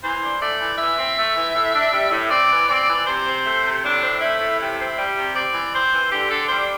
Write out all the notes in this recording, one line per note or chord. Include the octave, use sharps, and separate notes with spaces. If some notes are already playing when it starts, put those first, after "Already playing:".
E3 C5
D4
A3 D5
E3
E3 E5
C4
A3
E3
A2
D4
G3
A2
C4 D5
E3
C4 D5
E3
C3 C5
C4
A3
C3
A2 D4
C4
A3 E4
A2
C3 E4
C4
G3 G4
C3
C4 D5
E3
C4 C5
E3
D3 G4
D4 A4
G3 C5